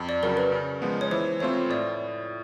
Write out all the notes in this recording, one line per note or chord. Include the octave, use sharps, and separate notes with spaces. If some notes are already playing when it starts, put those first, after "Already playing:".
Already playing: F2
D5
C#3 F#3 A#4
B4
C#3
F3 G#3 B3
C#5
E3 C5
A3 C4 F4 C#5
A2 D5